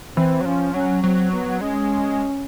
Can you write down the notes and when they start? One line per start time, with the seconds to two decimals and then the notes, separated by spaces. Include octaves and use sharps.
0.17 E3 C4
0.41 F#3
0.45 F3 C#4
0.74 F#3 C#4
1.03 F#3 C4
1.33 B3
1.60 G#3 C#4